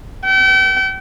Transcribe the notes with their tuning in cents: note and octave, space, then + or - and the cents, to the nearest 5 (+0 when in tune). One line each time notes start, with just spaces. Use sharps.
G5 -40